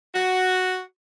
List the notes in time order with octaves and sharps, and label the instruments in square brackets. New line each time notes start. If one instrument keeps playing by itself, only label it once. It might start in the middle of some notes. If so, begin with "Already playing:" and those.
[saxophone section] F#4